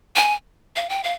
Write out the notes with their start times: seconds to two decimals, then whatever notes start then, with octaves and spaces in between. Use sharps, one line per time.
0.16 G#5
0.76 F5
0.90 G5
1.04 F5